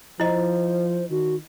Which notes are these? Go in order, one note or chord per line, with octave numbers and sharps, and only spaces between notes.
F3 E4 C5 D#5
D#3 F#4